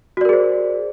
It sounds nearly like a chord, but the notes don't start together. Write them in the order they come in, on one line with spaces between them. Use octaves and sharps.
F#4 D5 A#4 G#4 C5